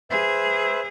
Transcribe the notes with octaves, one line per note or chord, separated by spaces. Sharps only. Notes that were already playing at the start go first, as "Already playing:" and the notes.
G#4 B4 C5 E5